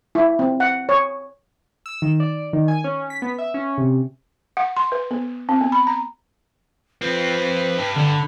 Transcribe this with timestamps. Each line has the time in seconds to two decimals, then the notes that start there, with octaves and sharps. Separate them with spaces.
0.15 E4
0.39 C4
0.60 F#5
0.89 C#5
1.86 E6
2.02 D#3
2.20 D5
2.53 D#3
2.68 G#5
2.84 C#4
3.10 B6
3.22 B3
3.38 E5
3.54 C#4
3.78 C3
4.57 F#5
4.76 C6
4.92 B4
5.11 B3
5.49 C4
5.61 B3
5.72 B5
5.87 A#5
7.02 F3 C4 B4
7.79 G2
7.97 D3 B5